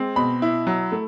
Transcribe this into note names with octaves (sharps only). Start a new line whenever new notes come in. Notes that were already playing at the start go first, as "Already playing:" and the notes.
Already playing: G#3 C4
B2 B5
E4
F#3
A3